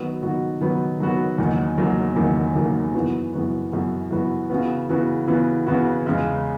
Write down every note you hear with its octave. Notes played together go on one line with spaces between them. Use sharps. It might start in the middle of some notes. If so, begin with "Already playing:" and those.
Already playing: D#3 F#3 B3 F#4 B4
D#3 F#3 B3 F#4 B4
D#3 F#3 B3 F#4 B4
D#3 F#3 B3 F#4 B4
E2 D#3 F#3 A#3
E2 D#3 F#3 A#3
E2 D#3 F#3 A#3
E2 D#3 F#3 A#3
F#2 E3 B3 F#4 B4
F#2 E3 B3 F#4 B4
F#2 E3 B3 F#4 B4
F#2 E3 B3 F#4 B4
C#3 E3 B3 F#4 B4
C#3 E3 B3 F#4 B4
C#3 E3 B3 F#4 B4
C#3 E3 B3 F#4 B4
E2 C#3 G#3